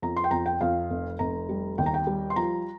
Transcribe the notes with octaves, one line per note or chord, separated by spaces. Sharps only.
F2 A#5
C6
G5
F2 A#5
G5
F2 F5
F1
F1 A#5
G3
D#2 G5
A#5
G5
G3
C6
F3 A#5